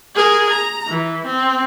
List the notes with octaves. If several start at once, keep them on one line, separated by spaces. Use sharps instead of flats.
G#4 A#4
A#5
E3
C4